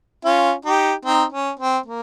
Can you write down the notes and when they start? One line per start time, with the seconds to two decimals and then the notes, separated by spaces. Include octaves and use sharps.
0.25 C#4 F4
0.65 D#4 G4
1.05 C4 D#4
1.32 C#4
1.59 C4
1.86 A#3